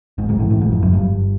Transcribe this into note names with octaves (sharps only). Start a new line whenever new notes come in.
G#1 G#2
G#1 G#2
A1 A2
A1 A2
G#1 G#2
F2
F#1 F#2
G1 G2